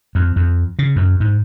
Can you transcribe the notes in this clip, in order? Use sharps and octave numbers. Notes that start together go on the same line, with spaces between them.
F2
F2
C#3
F#2
G#2